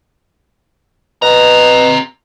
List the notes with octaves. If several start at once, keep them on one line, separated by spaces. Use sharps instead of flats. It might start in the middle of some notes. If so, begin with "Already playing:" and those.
B2 C4 A#5